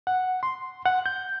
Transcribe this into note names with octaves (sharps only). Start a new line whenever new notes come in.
F#5
C6
F#5
G6